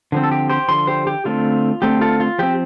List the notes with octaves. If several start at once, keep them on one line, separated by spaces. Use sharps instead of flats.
D3 F3 C4
A4
G4
G4 C5
D3 F3 C6
G4 C5
G4
D3 A3 C4 F4
D3 A3 C4 G4
F4 A4
F4
F3 C4 G4